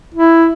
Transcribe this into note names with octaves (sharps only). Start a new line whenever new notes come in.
E4